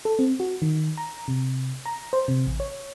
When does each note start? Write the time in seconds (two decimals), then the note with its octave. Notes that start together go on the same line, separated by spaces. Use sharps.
0.05 A4
0.19 C4
0.40 F#4
0.62 D#3
0.98 A#5
1.28 C3
1.86 A#5
2.13 C5
2.28 C3
2.47 A1
2.60 C#5